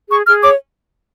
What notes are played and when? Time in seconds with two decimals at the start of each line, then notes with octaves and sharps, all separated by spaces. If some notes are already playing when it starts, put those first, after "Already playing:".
0.10 G#4 C#6
0.26 G#4 F6
0.42 C#5 D6